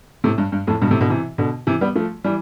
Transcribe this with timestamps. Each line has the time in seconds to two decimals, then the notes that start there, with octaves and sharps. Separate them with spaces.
0.24 A2 C3
0.38 G2
0.52 G2
0.67 F2 A2
0.81 G2 B2
0.91 A2 C3
1.01 B2 D3
1.10 C3 E3
1.38 B2 D3
1.67 C3 E3
1.81 G3 B3
1.95 F3 A3
2.25 E3 G3